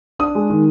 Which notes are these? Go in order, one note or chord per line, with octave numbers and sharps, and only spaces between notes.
D4 D#6
G#3
D#3